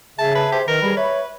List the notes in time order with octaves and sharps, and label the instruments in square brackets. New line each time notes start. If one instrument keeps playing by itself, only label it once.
[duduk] C#3 [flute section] G#4 E5 [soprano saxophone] A5
[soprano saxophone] B4 [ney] A5
[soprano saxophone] G4 [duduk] C5
[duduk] D#3 [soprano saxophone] A#4 [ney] B4 [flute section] F6
[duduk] G3 [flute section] G#4 B5
[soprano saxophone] B4 [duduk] C#5 [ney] E5 [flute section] B5